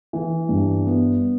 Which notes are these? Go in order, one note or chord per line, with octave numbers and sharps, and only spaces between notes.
E3
G2
B3